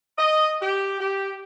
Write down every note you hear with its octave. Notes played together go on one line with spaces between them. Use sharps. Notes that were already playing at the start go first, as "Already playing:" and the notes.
D#5
G4
G4